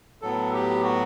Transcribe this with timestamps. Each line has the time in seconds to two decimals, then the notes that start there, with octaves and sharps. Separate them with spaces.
0.21 A2 F#3 B3 A4
0.53 G4
0.84 F#4